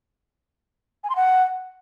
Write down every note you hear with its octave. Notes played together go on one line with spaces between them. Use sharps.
G#5
C6
F#5